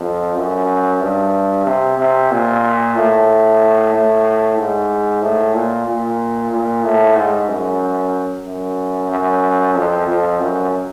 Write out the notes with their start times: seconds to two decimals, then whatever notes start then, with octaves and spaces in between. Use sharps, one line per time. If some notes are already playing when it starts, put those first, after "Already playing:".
Already playing: F2
0.36 F#2
1.01 G2
1.66 C3
1.98 C3
2.31 A#2
2.96 A2
3.93 A2
4.57 G#2
5.22 A2
5.54 A#2
5.87 A#2
6.51 A#2
6.84 A2
7.16 G#2
7.48 F#2
8.45 F#2
9.10 F#2
9.75 F2
10.07 F2
10.40 F#2